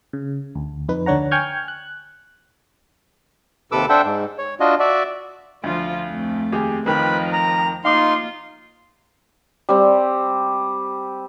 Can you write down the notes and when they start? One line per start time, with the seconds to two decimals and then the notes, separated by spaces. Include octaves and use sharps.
0.13 C#3
0.55 D2
0.88 F2 D#4 B4
1.06 D2 D3 D4 C#5 F#5 A#5
1.31 G5 G#5 C#6 F6 G6 G#6
1.68 F#6
3.72 D#2 C3 A4 B4 D6 E6
3.89 D4 A4 C5 E5 F#5 G5
4.04 G#2
4.38 C#5
4.60 D4 F4 F#4 D#5
4.80 F#4 D5 E5
5.64 D2 F3 F4
6.10 F2 A3
6.52 D#2 G4 G#4
6.86 F2 D#3 F3 C4 A#4 B4 D#5
7.32 A#5
7.85 A#3 D#4 F4 F5 C6 D6
9.69 G3 C4